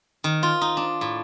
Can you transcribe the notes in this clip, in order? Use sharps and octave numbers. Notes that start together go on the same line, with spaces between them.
D#3
F4
D#4
D4
A2